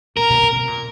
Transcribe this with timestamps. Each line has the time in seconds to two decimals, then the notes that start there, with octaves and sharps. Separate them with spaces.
0.17 A#2 A#4
0.30 B2
0.43 C3
0.56 C3
0.68 A#2